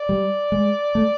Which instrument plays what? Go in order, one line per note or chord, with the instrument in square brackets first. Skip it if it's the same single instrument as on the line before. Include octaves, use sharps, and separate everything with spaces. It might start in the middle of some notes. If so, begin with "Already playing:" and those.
Already playing: [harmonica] D5
[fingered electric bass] G3
G#3
A3